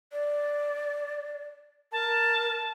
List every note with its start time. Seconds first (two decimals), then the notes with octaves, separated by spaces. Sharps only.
0.12 D5
1.92 A#4 A5